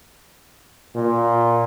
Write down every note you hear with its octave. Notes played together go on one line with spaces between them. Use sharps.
A#2